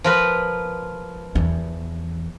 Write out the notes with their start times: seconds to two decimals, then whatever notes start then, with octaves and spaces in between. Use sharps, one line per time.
0.04 F3 A#4 B4
1.35 E2